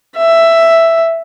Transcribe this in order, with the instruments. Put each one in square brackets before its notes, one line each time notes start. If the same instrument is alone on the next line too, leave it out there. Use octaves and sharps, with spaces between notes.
[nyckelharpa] E5